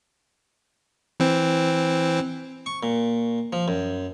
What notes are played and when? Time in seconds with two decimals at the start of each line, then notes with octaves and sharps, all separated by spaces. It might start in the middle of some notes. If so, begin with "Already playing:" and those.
1.20 E3 C4
2.66 C#6
2.83 A#2
3.53 F3
3.68 F#2